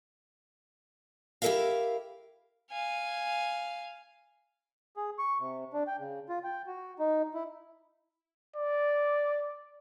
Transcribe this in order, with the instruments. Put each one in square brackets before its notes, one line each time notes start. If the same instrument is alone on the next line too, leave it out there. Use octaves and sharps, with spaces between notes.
[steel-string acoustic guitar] E4 G4 A4 A#4 E5 F5
[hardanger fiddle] F5 G#5
[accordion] G#4
C#6
C3
D4
G5
C#3
F4
G5
F#4
D#4
E4
[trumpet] D5